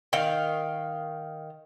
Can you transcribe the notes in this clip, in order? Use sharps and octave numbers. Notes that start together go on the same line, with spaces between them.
D#3 F5